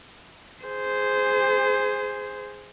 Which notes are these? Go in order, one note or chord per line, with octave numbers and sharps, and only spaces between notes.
G#4 C5